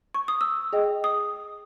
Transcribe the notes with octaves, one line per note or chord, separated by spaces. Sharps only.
C#6
D#6
E6
G#4 D#5 G5
D#6